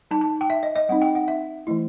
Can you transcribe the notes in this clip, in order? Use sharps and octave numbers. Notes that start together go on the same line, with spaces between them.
G3 D#4 A5
A5
G5
E5
D#5
D#5
G3 C4 D#4 F#5
G5
F#5
E5
E3 A3 E4